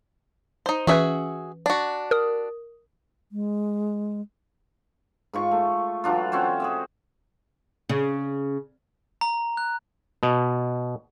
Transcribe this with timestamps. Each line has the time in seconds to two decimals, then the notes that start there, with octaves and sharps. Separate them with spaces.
0.66 D#4 C5
0.87 E3 C#4 F#4 G#4 B4 E5
1.66 D4 F#4
2.11 A#4 D#6
3.32 G#3
5.33 G#2 F4 C#6
5.51 A3
6.04 E3 F#3 D4 F4
6.32 C4 C#4 F#4 C5
6.60 G#4 D5 E5
7.89 C#3
9.21 A#5
9.57 F#6
10.23 B2